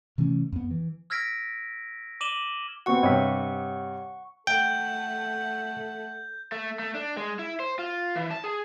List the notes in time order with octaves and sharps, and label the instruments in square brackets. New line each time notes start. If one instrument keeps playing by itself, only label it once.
[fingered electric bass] C3 E3 A3 C#4
F2 B3
E3
[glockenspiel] E6 F6 G#6 A#6 B6 D7
D6 D#7 E7 F#7 G7
[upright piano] B3 C4 F#4 [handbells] F#5 C#6
[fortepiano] G2 C3 [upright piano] C#5 [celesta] D#5 G5 B6
[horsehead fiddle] A3 F#5 [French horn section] A4 [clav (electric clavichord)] G5 [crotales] G6
[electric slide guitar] A3
A3
D4
G#3
E4
C5
F4
E3
A5
G#4